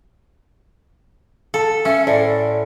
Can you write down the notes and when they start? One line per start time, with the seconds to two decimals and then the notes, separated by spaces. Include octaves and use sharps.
1.54 A4 F5 A5
1.85 C#4 E5 E6
2.07 A2 C5 D5